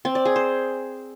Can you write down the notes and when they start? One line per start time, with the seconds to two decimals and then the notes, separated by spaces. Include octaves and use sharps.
0.05 C4
0.15 D5
0.25 G#4
0.36 C5